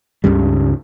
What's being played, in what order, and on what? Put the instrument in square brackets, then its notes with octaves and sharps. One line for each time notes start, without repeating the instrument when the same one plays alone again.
[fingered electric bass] C#2 G2 C#3 G3